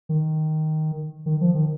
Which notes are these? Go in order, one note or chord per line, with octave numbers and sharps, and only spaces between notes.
D#3
D#3
F3
D#3